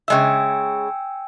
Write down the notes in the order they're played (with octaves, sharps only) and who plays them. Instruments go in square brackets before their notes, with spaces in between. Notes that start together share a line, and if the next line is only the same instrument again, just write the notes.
[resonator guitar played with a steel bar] C#3 G#3 E5 [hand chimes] G5 G#5 E6